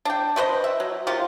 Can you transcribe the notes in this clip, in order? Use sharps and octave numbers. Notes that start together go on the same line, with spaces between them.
D4 G5
A3 B4 C5 D#5
E5
F#3
C3 D#3 F4